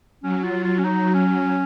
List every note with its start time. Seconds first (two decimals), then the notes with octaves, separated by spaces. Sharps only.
0.23 F#3 C#4
0.43 F4
0.64 F4
0.78 C#4
0.84 D#4
1.14 C#4